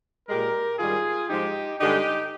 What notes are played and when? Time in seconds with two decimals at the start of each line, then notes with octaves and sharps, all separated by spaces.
0.28 A#2 G#3 G4 A#4
0.78 G#2 D#3 G3 F4 G#4
1.29 G#2 F3 G#3 D#4 G4
1.79 G2 D3 G#3 D#4 G4